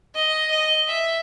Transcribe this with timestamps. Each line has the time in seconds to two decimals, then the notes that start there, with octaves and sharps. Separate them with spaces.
0.15 D#5
0.51 D#5
0.87 E5